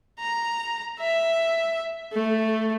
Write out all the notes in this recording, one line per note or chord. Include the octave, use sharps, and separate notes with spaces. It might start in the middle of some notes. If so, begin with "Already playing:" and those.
A#5
E5
A3